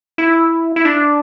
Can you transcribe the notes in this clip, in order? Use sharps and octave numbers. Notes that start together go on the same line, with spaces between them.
E4
E4
D4